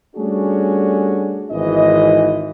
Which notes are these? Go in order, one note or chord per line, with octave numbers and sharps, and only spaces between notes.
G3 A3 C#4 D4 F#4 G#4
G#1 E3 D#5